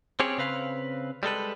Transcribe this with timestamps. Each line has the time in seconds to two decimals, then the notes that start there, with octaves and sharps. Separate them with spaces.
0.20 C4 C#4 G4 G#4 C#5
0.38 C#3 C4 B4 F5
1.23 G3 G#3 A4 B4